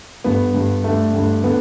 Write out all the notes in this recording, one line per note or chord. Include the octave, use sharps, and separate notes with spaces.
G2 D3 B3
G2 D3
G2 D3 A3
G2 D3
D3 B3